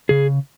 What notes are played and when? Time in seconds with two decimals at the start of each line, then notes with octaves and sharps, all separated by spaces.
0.09 C#3 G#4